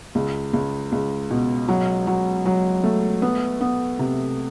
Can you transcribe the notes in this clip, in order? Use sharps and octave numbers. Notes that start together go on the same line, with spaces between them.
C#2
C#2
C#2
B2
F#3
F#3
F#3
A3
B3
B3
C3